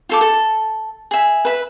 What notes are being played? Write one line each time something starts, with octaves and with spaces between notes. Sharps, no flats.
F4 A4 D6
A4
G#4 E5
B4 E5